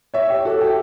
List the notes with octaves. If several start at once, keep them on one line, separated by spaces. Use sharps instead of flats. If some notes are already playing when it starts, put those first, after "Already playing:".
C#5 E5
G4
F#4 A4
G4